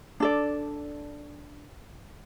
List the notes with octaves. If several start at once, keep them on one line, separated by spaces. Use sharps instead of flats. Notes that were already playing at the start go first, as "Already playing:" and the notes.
D4 A4 D5